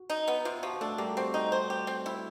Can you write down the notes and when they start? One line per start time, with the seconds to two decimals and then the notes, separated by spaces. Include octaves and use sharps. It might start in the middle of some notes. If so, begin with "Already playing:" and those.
Already playing: F#4
0.10 D#4
0.28 B3
0.45 C3 F4
0.63 F3 F#4
0.81 A3 D4 A4
0.98 G3 A#3 G4
1.17 C4 F#4
1.34 D#4
1.52 C5
1.70 G4
1.87 C4
2.06 E4